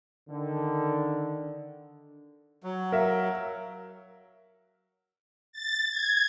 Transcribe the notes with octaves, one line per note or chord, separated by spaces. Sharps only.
D3 D#3
F#3
A#4 E5 F5
A6
G#6